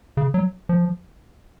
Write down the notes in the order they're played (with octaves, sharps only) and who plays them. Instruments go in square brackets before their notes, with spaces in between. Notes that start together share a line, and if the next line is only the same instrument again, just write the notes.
[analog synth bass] C#3
F#3
F3